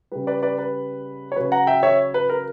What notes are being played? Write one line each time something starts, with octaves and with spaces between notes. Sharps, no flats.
C#3 G3 B4
B4 D5
B4 D5
B4
C#5
C#3 F#3 B4
F#5 A#5
E5 G5
C#5 E5
B4
A#4